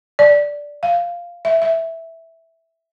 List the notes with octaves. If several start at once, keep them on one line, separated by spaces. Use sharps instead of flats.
D5
F5
E5
E5